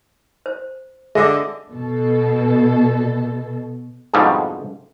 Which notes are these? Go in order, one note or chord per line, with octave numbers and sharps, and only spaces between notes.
C5
D3 G#3 G#4 D#5 E5 D6
B2 A4
F2 G#2 B2 D3 F3 G3